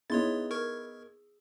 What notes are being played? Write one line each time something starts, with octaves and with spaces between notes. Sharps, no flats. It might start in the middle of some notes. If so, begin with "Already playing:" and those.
B3 D#4 E4 G#4 C#5 C6 A6
A#4 C#6 G#6